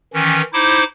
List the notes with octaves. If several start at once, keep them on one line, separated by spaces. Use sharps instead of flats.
D#3 E3 C#4
D#4 E4 C5 D6